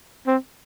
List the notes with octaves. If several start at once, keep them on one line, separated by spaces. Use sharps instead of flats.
C4